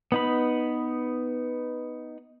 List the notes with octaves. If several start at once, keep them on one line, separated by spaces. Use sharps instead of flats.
B3 D#4 B5